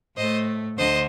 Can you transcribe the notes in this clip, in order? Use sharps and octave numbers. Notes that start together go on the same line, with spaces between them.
A2 A3 C5 D#5
D2 D3 C5 D#5